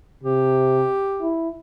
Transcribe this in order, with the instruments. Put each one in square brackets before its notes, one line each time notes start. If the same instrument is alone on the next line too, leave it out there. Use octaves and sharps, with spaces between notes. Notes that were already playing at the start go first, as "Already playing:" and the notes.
[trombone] C3 [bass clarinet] G4
[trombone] E4